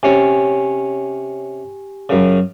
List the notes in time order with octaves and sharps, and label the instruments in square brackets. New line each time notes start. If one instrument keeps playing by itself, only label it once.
[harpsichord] C3 C#4 [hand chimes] G4 G#5
[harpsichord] F#2 C#3